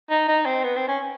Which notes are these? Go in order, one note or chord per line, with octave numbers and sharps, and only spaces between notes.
D#4
D#4
C4
B3
C4
C#4